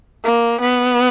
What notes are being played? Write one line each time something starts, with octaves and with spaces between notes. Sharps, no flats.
A#3
B3